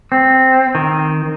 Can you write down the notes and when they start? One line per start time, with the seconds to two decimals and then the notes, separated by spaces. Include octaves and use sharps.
0.12 C4
0.75 D#3